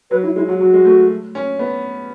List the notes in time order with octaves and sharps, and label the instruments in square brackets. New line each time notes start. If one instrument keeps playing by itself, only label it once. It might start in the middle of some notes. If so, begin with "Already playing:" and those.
[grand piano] F#3 [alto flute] B4
[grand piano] F#3 [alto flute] E4
[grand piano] G#3 [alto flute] E4
[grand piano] F#3 [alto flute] F#4
[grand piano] F#3 [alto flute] F#4
[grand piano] G#3
A3
C#4
B3